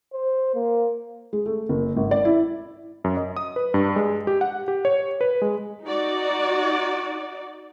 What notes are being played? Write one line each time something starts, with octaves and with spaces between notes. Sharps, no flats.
C5
A#3
G#3
A3
F#1
G#1
D5
E4
F#2
D#5
D#6
B4
G2
G#3
G4
F#5
G4
C#5
B4
G#3
D#4 F#4 D5